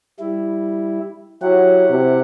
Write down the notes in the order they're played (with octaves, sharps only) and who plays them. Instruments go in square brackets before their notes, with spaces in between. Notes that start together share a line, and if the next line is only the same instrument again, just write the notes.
[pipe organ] G3 E4
[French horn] F#3 [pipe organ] E4 G4 F#5
[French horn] C3